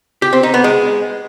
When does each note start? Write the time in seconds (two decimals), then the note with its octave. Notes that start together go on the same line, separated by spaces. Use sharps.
0.22 G4
0.33 C4
0.43 D#4
0.54 B3
0.64 G#3